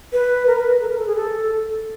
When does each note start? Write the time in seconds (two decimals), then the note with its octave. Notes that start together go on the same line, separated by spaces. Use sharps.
0.13 B4
0.47 A#4
0.58 B4
0.81 A4
0.89 A#4
0.98 A4
1.07 G#4
1.15 A4